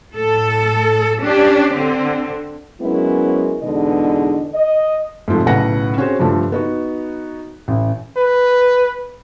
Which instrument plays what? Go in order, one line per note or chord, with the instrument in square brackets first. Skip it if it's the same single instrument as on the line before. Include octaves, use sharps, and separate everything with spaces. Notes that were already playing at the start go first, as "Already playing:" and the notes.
[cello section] A2 A4
C#4 D4 G4
D3 C4
[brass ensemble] F#3 G#3 B3 C#4 E4 A#4
E2 B2 D3 G#3 D#4 D#5
D#5
[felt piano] G#2 C3 F3 A3
B1 A2 C#3 B4 F#5 A#6
C4 C#4 F#4 G#4 C5
G2 D3 F3 A3
B3 D#4 F#4
A1
[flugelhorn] B4